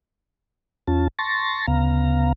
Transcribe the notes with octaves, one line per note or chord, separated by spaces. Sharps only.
E2 C#4 F4 A5
A5 C6 C#6 A6 A#6
D2 C#3 B3 F5 A#5